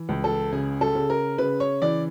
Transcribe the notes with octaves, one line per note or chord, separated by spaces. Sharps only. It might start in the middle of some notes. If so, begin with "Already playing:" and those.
Already playing: E3
C#2
A4
C#3 G#4
A4
C#3
A#4
C#3 B4
C#5
E3 D5